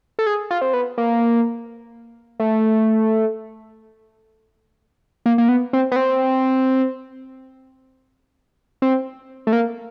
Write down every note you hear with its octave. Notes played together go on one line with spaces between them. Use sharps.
A4
G#4
F4
C4
B3
A#3
A3
A#3
A#3
B3
C4
B3
C4
C4
A3
A#3